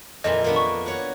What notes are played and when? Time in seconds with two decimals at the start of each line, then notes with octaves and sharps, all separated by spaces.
0.24 F2 A#2 E3 D#5
0.44 A#3 B3 D4
0.56 C#6
0.86 F#4 C#5